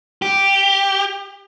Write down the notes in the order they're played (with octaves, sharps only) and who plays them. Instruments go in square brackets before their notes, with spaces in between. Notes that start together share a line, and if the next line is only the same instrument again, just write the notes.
[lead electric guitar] G4